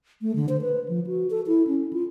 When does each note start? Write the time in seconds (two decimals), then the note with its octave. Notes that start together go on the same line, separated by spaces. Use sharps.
0.22 A3
0.36 D3
0.49 C5
0.61 B4
0.89 F3
1.07 F#4
1.30 A4
1.47 E4
1.67 C#4
1.93 F4